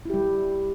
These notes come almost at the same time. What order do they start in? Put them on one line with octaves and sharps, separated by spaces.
E4 G4 G3